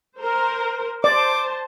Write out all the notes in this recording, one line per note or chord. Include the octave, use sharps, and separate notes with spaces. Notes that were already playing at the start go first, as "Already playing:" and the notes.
A#4 C5
C5 D5 A5 D6